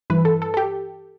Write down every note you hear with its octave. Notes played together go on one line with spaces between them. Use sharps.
G2 E3 B4
A4
A4
A4
G4